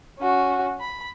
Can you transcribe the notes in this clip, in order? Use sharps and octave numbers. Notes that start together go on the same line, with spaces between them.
C#4 F#4
B5